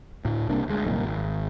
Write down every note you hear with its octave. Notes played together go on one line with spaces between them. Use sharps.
D2 A2
C2 C3 A#3 D4
D2 G#3
C2 F#2 A#2 D#3
G#1